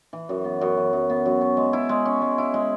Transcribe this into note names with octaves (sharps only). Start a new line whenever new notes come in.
E3
F#2
B3
F#2
E3
F#2
B3
F#2
C#4
G#3
E4
G#3
C#4
G#3
E4
G#3